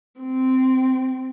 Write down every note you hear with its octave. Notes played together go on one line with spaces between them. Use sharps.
C4